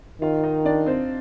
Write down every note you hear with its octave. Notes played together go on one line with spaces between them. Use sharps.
D#3 F4 F5
D#4 D#5
D4 D5
C4 C5